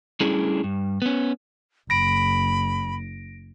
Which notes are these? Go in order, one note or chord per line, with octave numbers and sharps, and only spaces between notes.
G3 A3 C#4 D4 E4 G#4
G2
B3 C#4
F#1 B5 A#6 D7